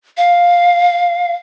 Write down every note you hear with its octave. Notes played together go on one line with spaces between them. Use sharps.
F5